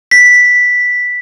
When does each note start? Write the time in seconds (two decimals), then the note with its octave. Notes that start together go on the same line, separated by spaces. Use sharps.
0.11 B6